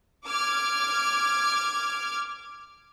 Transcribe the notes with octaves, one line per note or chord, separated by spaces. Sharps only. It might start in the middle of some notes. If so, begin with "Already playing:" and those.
D6 F6 G#6